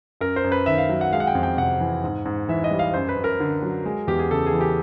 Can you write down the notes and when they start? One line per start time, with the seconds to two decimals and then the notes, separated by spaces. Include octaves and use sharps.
0.21 F#2 A#4
0.36 C5
0.44 F#2
0.52 B4
0.66 D#3 E5
0.78 F5
0.89 F#3
1.01 F#5
1.13 G#3 F5
1.20 F#5
1.27 G5
1.35 F2
1.43 G5
1.57 C3 F#5
1.80 E3
2.04 G#2
2.25 G#2
2.49 E3 E5
2.64 D#5
2.71 G3
2.79 F5
2.94 F#2 C5
3.09 B4
3.17 F#2
3.24 A#4
3.40 D3
3.63 F#3
3.86 G#3
4.07 E2 G4
4.19 G#4
4.30 C#3 A4
4.46 G#4
4.53 E3
4.61 G4